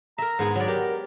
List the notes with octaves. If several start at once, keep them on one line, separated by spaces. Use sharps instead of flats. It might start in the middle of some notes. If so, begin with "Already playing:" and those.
A#4 E5 A#5
G#2 B3 G#4
F#3 D5
G4 A#4